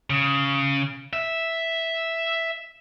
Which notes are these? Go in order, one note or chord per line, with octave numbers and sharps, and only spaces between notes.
C#3
E5